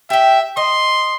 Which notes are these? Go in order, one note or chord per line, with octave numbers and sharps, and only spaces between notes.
G4 E5 G5
D#5 C6